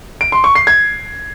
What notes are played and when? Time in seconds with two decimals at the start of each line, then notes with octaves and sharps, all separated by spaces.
0.21 D7
0.32 C6
0.44 C#6
0.55 C7
0.67 G#6